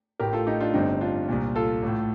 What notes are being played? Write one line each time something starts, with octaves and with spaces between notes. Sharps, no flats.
A1 A2 G4 A#4
F4 A4
D#4 G4
D4 F4
G1 G2 D3 C4 D#4
D4 F4
C2 A#2
F4 A4
A1 A2